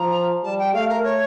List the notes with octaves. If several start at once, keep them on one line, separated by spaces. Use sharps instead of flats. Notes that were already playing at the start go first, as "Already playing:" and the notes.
Already playing: F3 A#5
G3 A5
G5
A3 F5
A#4
C#5